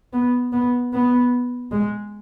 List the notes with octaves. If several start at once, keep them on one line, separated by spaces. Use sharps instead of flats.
B3
B3
B3
G#3